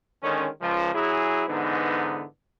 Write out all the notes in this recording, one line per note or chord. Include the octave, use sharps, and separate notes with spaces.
D3 D#3 G#3 C#4
C#2 F3
F#3 E4 G#4
G#2 D3 E3 B3 D#4